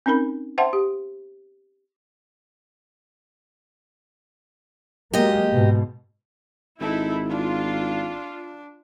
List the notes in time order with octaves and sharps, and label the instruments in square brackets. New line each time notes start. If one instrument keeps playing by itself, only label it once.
[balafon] C4 C#4 D#4 A#4 B5
C5 E5 F#5 G5 A5 C6
G4
[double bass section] F#3 G#3 A#3 [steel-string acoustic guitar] G4 D#5
[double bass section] G#2 B2
[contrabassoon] G#1 [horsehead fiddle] D#4 A4 [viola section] E4
[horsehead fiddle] D4 [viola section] F4